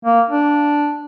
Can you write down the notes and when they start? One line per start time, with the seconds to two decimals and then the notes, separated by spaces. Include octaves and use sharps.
0.05 A#3
0.30 D4